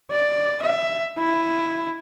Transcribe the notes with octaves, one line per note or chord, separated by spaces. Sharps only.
D5
E5
E4